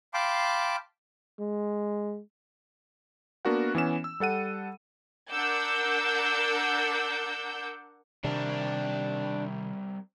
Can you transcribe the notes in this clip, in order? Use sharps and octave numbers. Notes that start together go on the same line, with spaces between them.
F5 G5 A5 B5 C6 D6
G#3
A#3 B3 D4 F#4 A#4 F#5
E3 B3 C#4 E7
E6
G3 A4 F#5 D#7
D4 A#4 F#5 D6 E6 G6
C3 D#3 G3 C4 D4 A#4